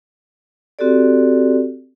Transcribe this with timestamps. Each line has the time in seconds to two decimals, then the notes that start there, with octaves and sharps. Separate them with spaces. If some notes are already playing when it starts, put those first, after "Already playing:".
0.79 C4 F#4 G4 A4 D5